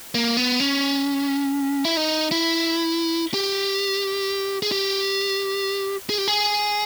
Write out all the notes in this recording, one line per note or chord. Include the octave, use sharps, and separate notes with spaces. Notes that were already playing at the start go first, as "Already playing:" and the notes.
A#3
B3
C#4
E4
D#4
E4
G4
G#4
G4
G#4
G4
G#4